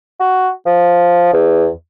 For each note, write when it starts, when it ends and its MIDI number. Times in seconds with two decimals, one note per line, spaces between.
0.20 0.50 66
0.66 1.30 53
1.33 1.68 40